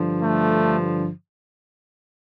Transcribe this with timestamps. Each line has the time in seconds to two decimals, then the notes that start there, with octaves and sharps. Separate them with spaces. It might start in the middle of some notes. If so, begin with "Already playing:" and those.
Already playing: G2 D3 F3
0.20 A3